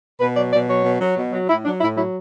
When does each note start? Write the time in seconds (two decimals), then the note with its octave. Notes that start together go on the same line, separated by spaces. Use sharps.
0.20 B2 B4
0.36 F#3 D5
0.53 B2 D5
0.69 F#3 C#5
0.85 B2
1.00 F#3
1.17 B2
1.32 F#3
1.49 A2 E4
1.65 F#3 D4
1.81 A2 E4
1.96 F#3 E4